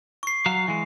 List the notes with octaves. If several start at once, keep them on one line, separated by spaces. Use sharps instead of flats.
C#6 C7
F#3 F5
E3 G#3